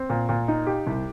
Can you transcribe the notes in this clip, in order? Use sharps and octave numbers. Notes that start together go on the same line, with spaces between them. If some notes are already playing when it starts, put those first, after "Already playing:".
Already playing: C4
A#2
A#2
D#4
G4
C2